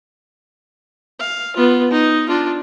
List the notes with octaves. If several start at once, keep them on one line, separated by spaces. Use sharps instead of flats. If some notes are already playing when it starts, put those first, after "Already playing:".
F5
B3 F4
D#4
D4 F4